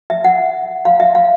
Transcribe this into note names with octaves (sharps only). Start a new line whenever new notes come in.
E5
F#5
F5
E5
F5